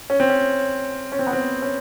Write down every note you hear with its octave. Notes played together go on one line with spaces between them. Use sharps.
C#4
C4
C#4
C#4
C4
B3
C4
C#4